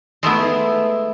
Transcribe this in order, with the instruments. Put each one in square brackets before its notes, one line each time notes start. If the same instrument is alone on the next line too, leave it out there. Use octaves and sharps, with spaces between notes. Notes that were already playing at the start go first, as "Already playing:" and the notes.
[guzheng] G#3 A3 B3 E4